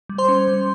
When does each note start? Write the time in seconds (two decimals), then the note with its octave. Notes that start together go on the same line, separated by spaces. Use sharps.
0.09 G3
0.18 C5 C6
0.28 C#4
0.48 G3